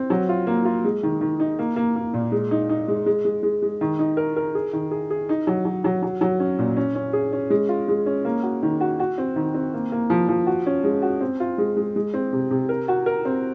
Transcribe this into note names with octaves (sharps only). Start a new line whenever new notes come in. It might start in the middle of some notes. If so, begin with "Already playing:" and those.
Already playing: C4
F#3
F4
A#3
F4
G#3
D#3
D#3
D#4
A#3
A#3
A#3
A#2
G#3
D#4
D#4
G#3
G#3
G#3
G#3
G#3
D#3
D#4
A#4
A#4
G#4
D#3
G#4
G#4
D#4
F#3
F#3
F#3
F#3
F#3
C#4
A#2
C#4
C#4
G#4
C#4
G#3
F4
G#3
C#4
A#3
F#4
D#3
F#4
F#4
C4
D#3
C4
A#3
A#3
F3
F3
F#4
C#4
G#3
F#4
C4
F4
G#3
G#3
G#3
C4
C3
C3
A#4
F#4
A#4
C4